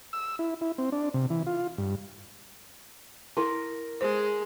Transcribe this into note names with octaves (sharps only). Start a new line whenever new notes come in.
E6
E4
E4
C4
D4
C3
E3
F4
G2
E4 A#4 C6
G#3 G#4 C5